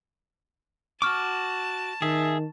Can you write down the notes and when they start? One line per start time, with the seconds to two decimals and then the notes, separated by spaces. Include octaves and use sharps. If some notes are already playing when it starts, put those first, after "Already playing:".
1.02 F#4 A5 C#6 D6 F6
2.02 D#3 G#4 E5